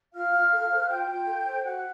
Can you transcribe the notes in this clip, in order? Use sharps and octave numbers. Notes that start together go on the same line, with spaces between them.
F4 F5 F6
F4
A4
C5
F#6
F4 G5 G6
F4
A4
C5
F#4 F#5 F#6